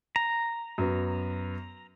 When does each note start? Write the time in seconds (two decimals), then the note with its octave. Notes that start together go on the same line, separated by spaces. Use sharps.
0.16 A#5
0.78 F#2 B3